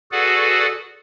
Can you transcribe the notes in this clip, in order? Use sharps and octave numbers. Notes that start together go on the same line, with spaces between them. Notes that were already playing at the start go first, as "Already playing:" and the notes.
F#4 G#4 A4 B4 D5 F#5